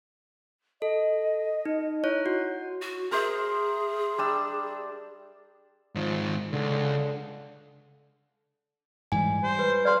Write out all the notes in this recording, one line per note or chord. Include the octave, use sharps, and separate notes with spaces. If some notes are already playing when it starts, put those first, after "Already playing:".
A4 D#5
D#4
E4 C#5 F#6
F#4
F#4
G#4 A#4 C5 E5
G3 D4 E6
G#2 D#3 F3
C#2 D3
G#2 E3 G3 G#5
G3 C5
B4
D5 F5 C6